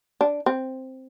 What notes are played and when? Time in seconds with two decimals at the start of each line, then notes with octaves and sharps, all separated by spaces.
0.21 D4
0.46 C4